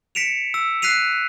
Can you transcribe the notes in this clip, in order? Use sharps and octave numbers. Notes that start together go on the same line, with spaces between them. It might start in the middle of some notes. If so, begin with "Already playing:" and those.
B6 C#7 D7 E7 F7
E6
F#6 B6 C7 D#7 F7